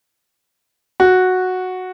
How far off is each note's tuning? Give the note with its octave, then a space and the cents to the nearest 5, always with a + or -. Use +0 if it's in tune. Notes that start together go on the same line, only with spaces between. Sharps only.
F#4 -5